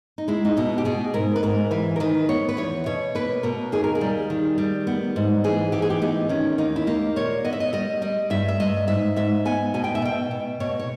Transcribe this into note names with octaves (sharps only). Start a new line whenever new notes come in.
D#4
G#3 E4
D#4
B2 E4
G4
B2 G#4
G#2 A#4
B4
G#2 A#4
E3 B4
A#4
D#3 B4
B3 C#5
B4
E2 C#5
B2 C#5
A#3 B4
B2 A#4
D#2 G#4
A#4
G#4
G3
D#3
G3
B3
G#2
E3 G#4
E3 G4
G#4
G4
B3 D#4
D#3 C#4
D#2 D#4
E4
A#3 G4
A#2 C#5
B3 D#5
E5
D#5
G3 D#5
G3 D#5
G2 E5
E5
G2 D#5
G#2 E5
G#2 E5
B3 G#5
B2 G#5
G5
E5
B2 G5
B2
B2 C#5
C#5